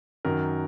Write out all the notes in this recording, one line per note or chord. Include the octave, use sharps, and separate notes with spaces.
F#2 D#3 A#4